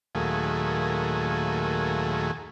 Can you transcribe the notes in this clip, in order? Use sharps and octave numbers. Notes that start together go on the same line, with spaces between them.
D#2 A#2 F#3 A3 G#4